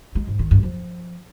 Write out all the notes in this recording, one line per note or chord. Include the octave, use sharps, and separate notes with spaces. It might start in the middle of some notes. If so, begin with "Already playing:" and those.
G#3
G#2
D#3
G2
F3